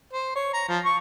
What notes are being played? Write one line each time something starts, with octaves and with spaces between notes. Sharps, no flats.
C5
C#5
A#5
F3
C#6